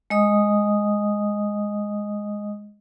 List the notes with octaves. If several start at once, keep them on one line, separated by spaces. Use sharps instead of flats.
G#3 D#5 D#6